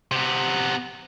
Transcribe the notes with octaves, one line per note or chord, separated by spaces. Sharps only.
C3 B3